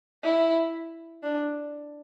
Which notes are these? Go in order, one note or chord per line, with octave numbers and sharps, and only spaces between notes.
E4
D4